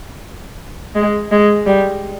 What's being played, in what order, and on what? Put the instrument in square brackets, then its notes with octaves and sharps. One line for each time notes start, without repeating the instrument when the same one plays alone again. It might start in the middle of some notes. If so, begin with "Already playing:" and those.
[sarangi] G#3
G#3
G3